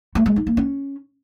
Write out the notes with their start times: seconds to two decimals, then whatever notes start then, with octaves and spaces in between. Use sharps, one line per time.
0.15 A3
0.26 G#3
0.36 D#4
0.47 A#3
0.57 C#4